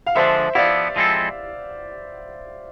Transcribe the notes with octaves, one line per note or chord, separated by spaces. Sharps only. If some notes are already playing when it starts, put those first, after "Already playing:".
F5
D3 F3 G#3 D4 C5 E5
F3 B3 E4 D5 F5
F3 G#3 C4 E4 A4